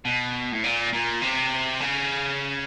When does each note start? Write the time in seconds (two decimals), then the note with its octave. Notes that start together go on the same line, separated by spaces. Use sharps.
0.05 B2
0.52 A2
0.63 A#2
0.93 A#2
1.22 C3
1.80 C#3